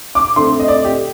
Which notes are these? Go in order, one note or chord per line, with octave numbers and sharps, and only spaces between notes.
D6
D3 A3 C4 C6
D#5
D5
G4